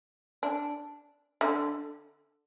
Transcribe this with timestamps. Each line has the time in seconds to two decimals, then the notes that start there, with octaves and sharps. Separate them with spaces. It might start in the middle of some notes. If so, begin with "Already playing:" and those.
0.43 D4
1.41 D3